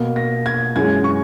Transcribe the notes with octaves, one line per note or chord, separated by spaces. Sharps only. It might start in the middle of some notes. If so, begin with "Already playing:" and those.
Already playing: B2 A#3
A#6
G#6
F#2 E3 G#3 G#6
C#6